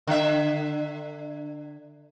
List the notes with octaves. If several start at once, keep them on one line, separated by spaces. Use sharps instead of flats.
D3 E5